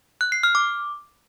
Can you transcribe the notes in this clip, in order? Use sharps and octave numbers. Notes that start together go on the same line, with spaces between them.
F#6
C7
F6
D6